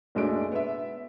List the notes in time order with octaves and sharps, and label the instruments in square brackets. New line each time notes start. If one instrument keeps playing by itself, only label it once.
[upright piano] F#1 B1 G#3 A3 D4 D7
B3 E5